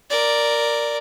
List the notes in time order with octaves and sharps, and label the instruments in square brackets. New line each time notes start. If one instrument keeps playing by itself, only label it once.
[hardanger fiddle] A#4 D5